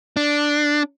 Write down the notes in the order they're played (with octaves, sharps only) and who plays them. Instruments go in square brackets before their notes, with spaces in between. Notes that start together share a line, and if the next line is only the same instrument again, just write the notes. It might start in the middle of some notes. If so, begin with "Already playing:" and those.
[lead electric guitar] D4